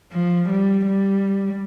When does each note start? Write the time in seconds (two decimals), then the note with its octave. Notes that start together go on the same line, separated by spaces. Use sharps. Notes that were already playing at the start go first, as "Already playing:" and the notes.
0.13 F3
0.49 G3
0.86 G3